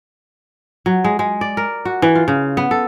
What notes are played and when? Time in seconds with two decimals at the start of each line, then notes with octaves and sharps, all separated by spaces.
0.86 F#3
1.04 G#3
1.19 G#3
1.41 D5
1.57 A#4
1.85 F#4
2.02 E3
2.15 F4
2.28 C#3
2.57 B3
2.71 A4